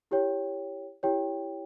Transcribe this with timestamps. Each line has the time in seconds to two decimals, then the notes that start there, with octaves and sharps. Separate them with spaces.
0.11 E4 G4 C#5 G5
1.03 E4 G4 C#5 G5